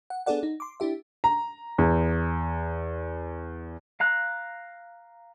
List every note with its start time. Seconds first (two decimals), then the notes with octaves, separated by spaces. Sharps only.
0.10 F#5
0.26 B3 D4 G#4 A4 D5 F#5
0.43 D#4
0.60 C6 D6
0.80 D4 E4 G4 E5
1.24 A#5
1.78 E2
4.00 F5 A#5 F#6